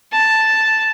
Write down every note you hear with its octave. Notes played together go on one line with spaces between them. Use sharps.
A5